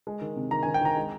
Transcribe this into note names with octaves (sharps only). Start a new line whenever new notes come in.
G#3
D#3
C3
D#3 A#5
G#5
D#3
G5
D#3 A#5
G#3